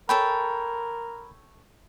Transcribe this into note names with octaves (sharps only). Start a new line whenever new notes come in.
A4 A#4 C#5 G5 B5